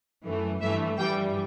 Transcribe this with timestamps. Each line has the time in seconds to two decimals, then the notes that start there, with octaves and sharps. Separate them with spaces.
0.24 F#2 E3 A3
0.61 G2 E3 A3 E5
0.98 G2 E3 G3 G5